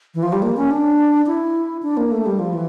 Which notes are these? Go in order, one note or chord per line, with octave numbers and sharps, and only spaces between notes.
E3
F3
G3
A#3
C#4
D4
E4
D4
A#3
A3
G3
F3
E3